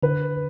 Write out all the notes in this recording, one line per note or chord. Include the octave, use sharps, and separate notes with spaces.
D3 B4